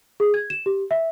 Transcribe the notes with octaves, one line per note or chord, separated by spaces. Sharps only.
G#4
G#6
E7
G4
E5